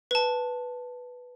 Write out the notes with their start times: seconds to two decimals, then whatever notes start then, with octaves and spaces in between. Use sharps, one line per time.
0.11 B4 A5